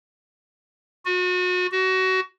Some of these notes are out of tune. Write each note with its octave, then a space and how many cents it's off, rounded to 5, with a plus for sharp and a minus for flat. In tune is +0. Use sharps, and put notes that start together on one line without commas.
F#4 -35
F#4 +25